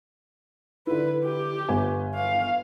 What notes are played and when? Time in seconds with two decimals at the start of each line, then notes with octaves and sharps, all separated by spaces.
0.87 D3 E4 B4
1.25 G4
1.69 G1 B4 G#5
2.14 F5